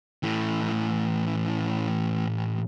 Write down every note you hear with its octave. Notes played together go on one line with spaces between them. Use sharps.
A2 E3